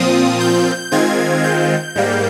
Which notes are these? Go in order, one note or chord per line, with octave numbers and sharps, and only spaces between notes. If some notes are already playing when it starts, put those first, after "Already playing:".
Already playing: A#2 F3 C4 F4 D#6
G6
D#3 G#3 C4 F4 G#6
G6
G#2 G3 A#3